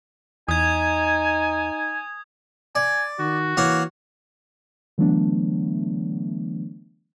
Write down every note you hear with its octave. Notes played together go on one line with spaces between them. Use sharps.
E2 D#4 G#5 D#6 G#6
D5 G#5
D#3 F#4
E3 A#3 C#5 F#5
D3 E3 F#3 A3 B3 D4